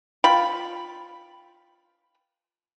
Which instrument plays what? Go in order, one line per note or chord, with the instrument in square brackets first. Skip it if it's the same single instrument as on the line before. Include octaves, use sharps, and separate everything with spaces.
[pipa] F4 G5 B5